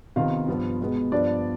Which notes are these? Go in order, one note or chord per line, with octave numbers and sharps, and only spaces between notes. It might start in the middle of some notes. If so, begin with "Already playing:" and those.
C3 D#3 B3 F4 F5
G2 F3 B3
B2 G#3 B3
G2 F3 B3 D4 D5